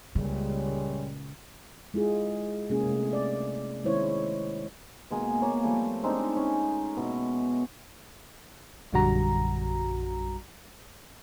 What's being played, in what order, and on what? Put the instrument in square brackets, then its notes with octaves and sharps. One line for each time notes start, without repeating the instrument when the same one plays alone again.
[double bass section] C#2 A#2 [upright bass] C#3 [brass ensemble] G3 G#3 C#4
[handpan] G#3 E4 F4 G#4
C3 G#3 A#3 C#4 G#4
C3 A3
D5
D#3 G#3 E4 C5 C#5
[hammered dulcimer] B2 G#3 A#3 G#4
A#3 C#5
F3 G3 A3
G#3 C4 D4 D#4
C#4
B2 E4
[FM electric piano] A#1 F#2 D3 G3 F#4 A#5